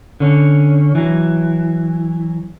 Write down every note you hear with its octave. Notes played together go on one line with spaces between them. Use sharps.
D3 C#4
E3 F#3